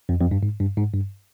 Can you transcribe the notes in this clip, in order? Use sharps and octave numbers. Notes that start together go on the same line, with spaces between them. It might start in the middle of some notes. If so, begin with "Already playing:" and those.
F2
F2
G2
G#2
G2
G#2
G2